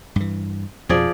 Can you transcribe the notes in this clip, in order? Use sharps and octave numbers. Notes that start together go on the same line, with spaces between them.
G2 E3
F2 B2 F3 G#4 D5